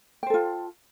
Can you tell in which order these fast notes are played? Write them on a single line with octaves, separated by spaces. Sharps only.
G5 C5 A4 F4